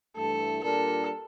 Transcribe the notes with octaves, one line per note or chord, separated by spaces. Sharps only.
G2 E3 A3 A4
A#2 G3 D4 F4 A4 A#4